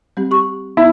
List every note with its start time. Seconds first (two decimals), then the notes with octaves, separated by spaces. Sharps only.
0.17 G3 C4 G4
0.31 G4 C#6
0.77 B3 E4